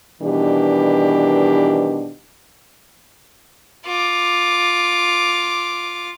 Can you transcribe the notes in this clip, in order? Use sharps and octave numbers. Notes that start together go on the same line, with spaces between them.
B2 D#3 E3 G3 D4 G4
F4 D6